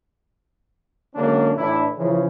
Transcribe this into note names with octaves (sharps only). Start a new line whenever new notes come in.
D3 F#3 G#3 A#3 C#4 D4
A2 E3 D4 E4
C#3 E3 F3